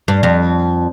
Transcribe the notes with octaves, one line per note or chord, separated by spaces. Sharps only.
G2
F2